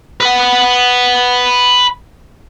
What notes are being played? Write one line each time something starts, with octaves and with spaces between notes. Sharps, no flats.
B4 F#5